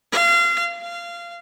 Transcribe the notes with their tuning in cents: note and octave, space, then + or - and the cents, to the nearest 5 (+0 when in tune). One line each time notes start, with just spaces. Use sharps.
F5 -30
F5 -20